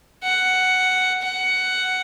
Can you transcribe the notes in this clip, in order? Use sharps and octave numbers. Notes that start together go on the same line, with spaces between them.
F#5
F#5